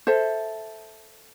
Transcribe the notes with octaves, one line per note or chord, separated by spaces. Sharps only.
A4 C5 E5